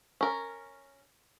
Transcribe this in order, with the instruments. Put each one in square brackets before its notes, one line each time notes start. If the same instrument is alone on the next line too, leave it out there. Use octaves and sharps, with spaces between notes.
[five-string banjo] C#4 A#4